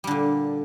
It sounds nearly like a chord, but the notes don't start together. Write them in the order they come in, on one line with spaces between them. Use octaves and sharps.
G3 D3 A#2